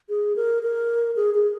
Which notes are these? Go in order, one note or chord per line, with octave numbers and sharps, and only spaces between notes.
G#4
A#4
A#4
G#4
G#4